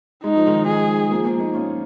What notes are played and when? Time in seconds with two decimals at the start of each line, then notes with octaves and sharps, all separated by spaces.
0.24 G#3 D#4
0.35 F3
0.46 D#3 G#3
0.68 G#4
1.11 F3 A#3
1.25 F3 A#3
1.39 A#3 D#4
1.54 C#4 F4